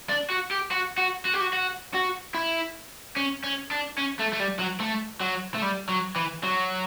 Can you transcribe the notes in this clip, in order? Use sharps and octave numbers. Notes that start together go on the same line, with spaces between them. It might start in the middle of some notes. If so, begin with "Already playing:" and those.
D4
F#4
G4
F#4
F#4
F#4
G4
F#4
F#4
F#4
E4
C#4
C#4
D4
C#4
A3
A3
G3
F#3
A3
F#3
A3
G3
F#3
E3
F#3